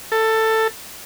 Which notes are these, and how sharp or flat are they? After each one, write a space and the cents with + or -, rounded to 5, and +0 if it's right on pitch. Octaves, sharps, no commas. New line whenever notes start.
A4 +15